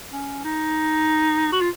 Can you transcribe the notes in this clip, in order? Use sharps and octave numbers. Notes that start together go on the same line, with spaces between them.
C#4
D#4
F#4
F4